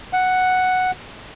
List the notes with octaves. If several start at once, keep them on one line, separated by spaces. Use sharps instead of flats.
F#5